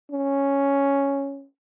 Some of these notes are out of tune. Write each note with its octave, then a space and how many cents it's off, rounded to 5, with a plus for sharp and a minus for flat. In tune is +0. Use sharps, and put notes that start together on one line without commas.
C#4 +0